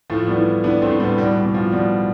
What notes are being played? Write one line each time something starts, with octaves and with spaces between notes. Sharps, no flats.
A2 F3 A3
G3 B3
E3
E3 B3 D4
A3 C4
A2
G3 B3
B2 G3
G3
B2
F3
B2 G3